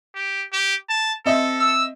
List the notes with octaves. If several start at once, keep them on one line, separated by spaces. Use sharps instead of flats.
G4
G4
A5
C4 A4 D#5 E5
E6